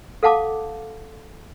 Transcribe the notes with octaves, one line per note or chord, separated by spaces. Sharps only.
A4 F5 F#5 A5 D6